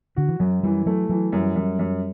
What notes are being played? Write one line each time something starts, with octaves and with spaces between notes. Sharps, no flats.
D3 F#4
E3
F#2 F#3
E3 G3
F#3 A3
E3 F#3
F#2 G3
F#2
F#2